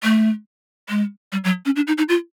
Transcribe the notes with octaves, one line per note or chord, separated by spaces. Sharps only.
A3
G#3
G3
F#3
C#4
D4
D#4
D#4
F4